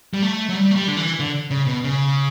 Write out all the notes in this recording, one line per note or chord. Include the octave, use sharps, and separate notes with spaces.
G3
A3
F#3
G3
A3
G3
D3
E3
D3
C#3
B2
C#3